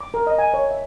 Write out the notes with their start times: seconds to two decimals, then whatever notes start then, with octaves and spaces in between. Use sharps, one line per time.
0.01 D6
0.14 A#4
0.27 D#5
0.38 G#5
0.54 C#5
0.71 E5